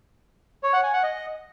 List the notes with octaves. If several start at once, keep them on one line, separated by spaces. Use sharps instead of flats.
C#5
F#5
G#5
F#5
D#5